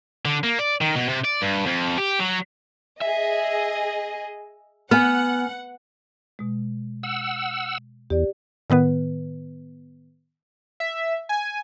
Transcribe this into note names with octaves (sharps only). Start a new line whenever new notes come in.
D3
A#3
D5
D#3
B2
C3
D5
G2
F2
G4
F#3
G#4 D#5 E5
B3 F#5 G#5 F6
B2 G#3
F#5 E6
E2 G4 D5
A2 D#3 B3 B4
E5
G#5